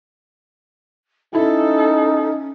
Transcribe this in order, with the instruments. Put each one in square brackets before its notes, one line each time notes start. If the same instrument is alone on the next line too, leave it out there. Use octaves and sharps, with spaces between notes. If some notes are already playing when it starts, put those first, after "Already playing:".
[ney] C#4 [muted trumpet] D#4 [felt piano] E4 [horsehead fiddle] A4